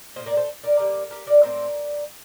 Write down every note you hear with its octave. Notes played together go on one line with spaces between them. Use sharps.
A2 G3 A#3 C5 D#5
A#4 D5
A4 C5
A#4 D5
D3 G3 A#3
G4 A#4
A#4 D5
A2 A3 C4 A#4 D5